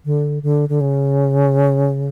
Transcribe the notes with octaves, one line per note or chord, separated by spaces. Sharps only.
D3
D3
D3
C#3